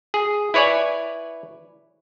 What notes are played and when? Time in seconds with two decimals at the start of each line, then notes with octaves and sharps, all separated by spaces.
0.14 G#4
0.54 E4 B4 C#5 D5 G#5